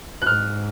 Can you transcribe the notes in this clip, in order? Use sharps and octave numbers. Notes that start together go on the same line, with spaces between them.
F#6
G#2 F6